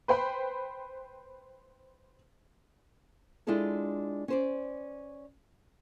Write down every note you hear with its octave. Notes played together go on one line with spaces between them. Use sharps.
B4 C5 G5 B5
G#3 D4 E4 F4 G#4 A4
C#4 C5 D5